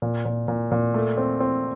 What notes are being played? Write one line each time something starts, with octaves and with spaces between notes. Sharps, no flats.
A#2
A#2
A#2
A#2
A3
C4
C4